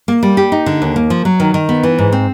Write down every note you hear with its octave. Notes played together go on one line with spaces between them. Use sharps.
A#3
G3
G4
D#4
D3
D#2
A#3
F3
F#3
D#3
D#3
B3
E3
G#2
C4